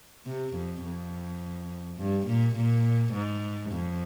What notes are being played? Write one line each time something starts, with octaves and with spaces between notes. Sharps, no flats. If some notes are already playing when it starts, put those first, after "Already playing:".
C3
F2
F2
G2
A#2
A#2
G#2
F2